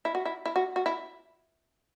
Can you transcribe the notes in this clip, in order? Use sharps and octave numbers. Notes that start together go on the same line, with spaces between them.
E4
F#4
E4
E4
F#4
F#4
E4